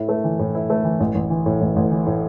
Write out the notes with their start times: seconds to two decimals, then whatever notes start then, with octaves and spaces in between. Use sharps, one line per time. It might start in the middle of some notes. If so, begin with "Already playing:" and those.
Already playing: A2 E4
0.09 A3
0.24 E3
0.39 A2
0.55 E4
0.70 A3
0.84 E3
1.00 A1
1.15 A1
1.30 E3
1.46 A2
1.61 A1
1.76 A1
1.91 E3
2.06 A2